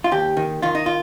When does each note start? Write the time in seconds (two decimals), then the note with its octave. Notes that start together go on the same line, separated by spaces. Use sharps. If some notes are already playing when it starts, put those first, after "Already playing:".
0.04 F4
0.11 D#2 G4
0.37 D#3
0.62 D#3 F4
0.75 D#4
0.86 F4